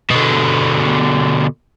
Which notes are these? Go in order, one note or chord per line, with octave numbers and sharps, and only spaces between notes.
B2 D3